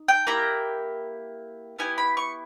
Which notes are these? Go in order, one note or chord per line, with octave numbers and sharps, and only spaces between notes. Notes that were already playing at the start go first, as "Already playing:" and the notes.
Already playing: D#4
G5
A#3 E4 G4 A#5
B3 E4 G4 G#5
B5
C#6